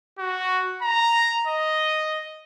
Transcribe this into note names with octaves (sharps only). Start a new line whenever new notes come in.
F#4
A#5
D#5